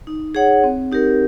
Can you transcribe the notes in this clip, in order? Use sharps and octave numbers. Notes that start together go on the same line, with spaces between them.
D#4
G#4 C#5 F#5
C4
D#4 G4 A#4